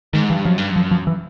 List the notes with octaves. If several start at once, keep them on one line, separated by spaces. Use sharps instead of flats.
G#2 D#3
G2 E3
F#2 F3
G2
F#2
F3
F3
E3